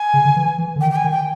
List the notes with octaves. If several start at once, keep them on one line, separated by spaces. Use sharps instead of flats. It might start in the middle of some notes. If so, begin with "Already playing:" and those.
Already playing: G#5
C#3
D3
E3
E3
D3
D#3 G5
G5
G#5
D#3
G5